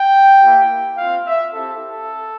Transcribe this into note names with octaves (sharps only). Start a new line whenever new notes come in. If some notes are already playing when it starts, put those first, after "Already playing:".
Already playing: G5
A#3 E4 G4
C4 F4 F5
E5
C4 E4 G4 A4
A4